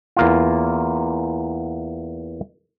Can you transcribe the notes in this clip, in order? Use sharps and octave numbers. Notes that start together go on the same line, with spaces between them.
E2 A#3 F4